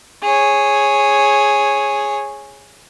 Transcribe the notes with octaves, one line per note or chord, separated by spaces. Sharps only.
G#4 C#5